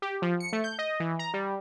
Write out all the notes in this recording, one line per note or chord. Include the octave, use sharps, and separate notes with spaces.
G4
F3
C#7
A3
G6
D#5
E3
A#5
G3